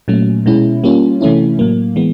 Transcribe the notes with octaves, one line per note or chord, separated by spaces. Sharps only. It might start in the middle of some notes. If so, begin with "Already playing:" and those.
A#2 F#3 A3 C#4
B2 G#3 C#4 E4
G3 A#3 C#4 F4
C3 E3 A3 C#4 E4
A2 F#3 A#3
E3 G#3 B3